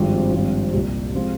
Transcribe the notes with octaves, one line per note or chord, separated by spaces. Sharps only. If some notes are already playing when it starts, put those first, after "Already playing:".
Already playing: G#1 G2 F3 C4
G#1 G2 F3 C4 F4
C2 A#2 G3
C3 F3 G#3 C4 F4